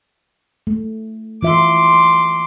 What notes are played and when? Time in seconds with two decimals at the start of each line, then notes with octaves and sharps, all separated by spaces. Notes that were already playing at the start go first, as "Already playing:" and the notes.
0.67 A3
1.43 E3 F4 E5 C6 D6